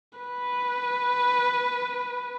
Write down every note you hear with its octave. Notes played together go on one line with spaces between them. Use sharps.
B4